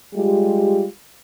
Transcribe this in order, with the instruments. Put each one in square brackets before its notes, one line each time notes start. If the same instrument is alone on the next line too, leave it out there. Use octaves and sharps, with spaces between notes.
[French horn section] G3 G#3 F4 G4